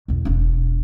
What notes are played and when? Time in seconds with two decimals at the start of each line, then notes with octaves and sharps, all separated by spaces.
0.08 B1 E2
0.25 E1 D4